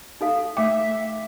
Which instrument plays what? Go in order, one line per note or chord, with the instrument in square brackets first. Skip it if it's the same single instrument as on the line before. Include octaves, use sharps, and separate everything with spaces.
[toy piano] D#4 A4 F5
[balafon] A3 D6 [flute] E5 [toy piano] G5